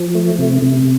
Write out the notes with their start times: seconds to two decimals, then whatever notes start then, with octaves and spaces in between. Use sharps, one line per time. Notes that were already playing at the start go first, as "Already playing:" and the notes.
Already playing: F3
0.15 A3
0.39 C3
0.62 C3